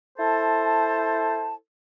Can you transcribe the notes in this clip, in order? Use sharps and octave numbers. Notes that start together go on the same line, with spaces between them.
E4 A4 C5 A5